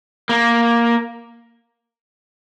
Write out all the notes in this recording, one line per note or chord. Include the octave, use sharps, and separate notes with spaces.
A#3